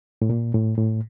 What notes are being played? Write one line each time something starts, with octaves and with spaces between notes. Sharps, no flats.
A2
A#2
A2
A2